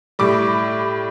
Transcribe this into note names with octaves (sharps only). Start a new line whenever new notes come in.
A2 G3 D6